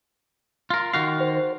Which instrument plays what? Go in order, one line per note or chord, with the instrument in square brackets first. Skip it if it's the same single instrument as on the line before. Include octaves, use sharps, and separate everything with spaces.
[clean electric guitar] F4 A#4 [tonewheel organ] C6
[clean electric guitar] D#3 F#4 F5
[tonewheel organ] C5